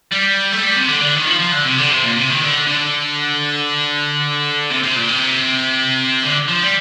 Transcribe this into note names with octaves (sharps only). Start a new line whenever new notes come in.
G3
A3
G3
C3
D3
D3
D#3
F3
F3
D3
C3
D3
C3
A#2
C3
D#3
D3
D3
C3
C3
A#2
C3
D3
F3
G3